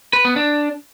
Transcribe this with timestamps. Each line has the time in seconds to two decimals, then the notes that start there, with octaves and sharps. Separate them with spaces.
0.13 B4
0.25 B3
0.36 D4